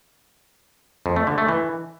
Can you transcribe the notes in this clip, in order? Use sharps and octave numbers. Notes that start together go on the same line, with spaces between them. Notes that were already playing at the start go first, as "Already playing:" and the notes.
F2
A3
D3
A3
E3